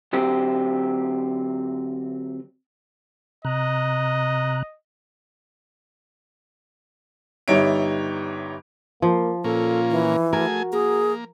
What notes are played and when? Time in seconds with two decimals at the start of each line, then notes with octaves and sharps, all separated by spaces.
0.13 D3 F#3 C4 G4
3.45 C3 D#5 A#5 F#6
7.48 G1 G3 D#4 C#5 E5 D7
9.02 F3 A#3
9.44 A#2 A#3 C#4 F4 A4
9.91 E3
10.33 A3 F#4 G#4 A#4 G#5
10.73 A#3 G#4